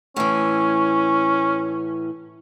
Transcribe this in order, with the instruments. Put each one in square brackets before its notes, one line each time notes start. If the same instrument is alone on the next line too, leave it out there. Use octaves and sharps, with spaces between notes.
[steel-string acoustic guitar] A2 E3 [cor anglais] C#4